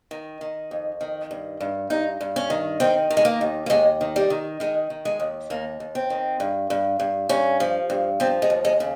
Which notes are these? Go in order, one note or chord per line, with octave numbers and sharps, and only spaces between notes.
D#3
D#3
F2
D#3
G2
G2
G2 D#4
G2
C#4
D#3
D#3 C4
D#3
G#3
A#3
D#2
A#3
D#2 G#3
D#3
G3
D#3
D#3 G#3
D#3
G#3
D#2
D#2 A#3
D#2
C4
D#3
G2
G2
G2
G2 C#4
F3
G2
F3 C4
G#3
D#2
G#3
C#3